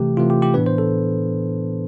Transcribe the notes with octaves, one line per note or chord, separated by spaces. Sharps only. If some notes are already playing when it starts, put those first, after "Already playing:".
Already playing: C3 E3 A3 G4
C3 E3 A3 F4
G4
G4
A2 E3 B3 D4 B4
C5
A4